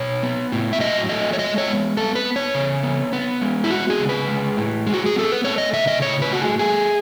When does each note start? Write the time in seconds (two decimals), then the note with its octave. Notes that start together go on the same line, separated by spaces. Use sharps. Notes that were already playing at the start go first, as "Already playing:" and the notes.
Already playing: B2 C#5
0.23 B3
0.52 A2
0.73 E5
0.80 F#3 D#5
1.09 A3 D#5
1.33 C#5
1.39 G#3 D#5
1.58 C#5
1.68 B3
1.97 B3 A4
2.15 B4
2.25 B3
2.36 C#5
2.55 C#3
2.83 B3
3.13 B3
3.41 G#3
3.64 E4
3.71 B3 F#4
3.90 G#4
3.99 C#3
4.09 B4
4.28 G#3
4.57 A2
4.87 G#3
4.94 F#4
5.06 G#4
5.15 B3 A4
5.32 B4
5.44 A3 C#5
5.58 D#5
5.73 C#3 E5
5.87 D#5
6.01 A2 C#5
6.22 B4
6.31 A3 F#4
6.41 G#4
6.59 A3 G#4